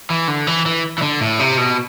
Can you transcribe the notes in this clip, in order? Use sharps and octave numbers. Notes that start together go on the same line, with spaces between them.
E3
D3
E3
E3
E3
D3
A2
C3
B2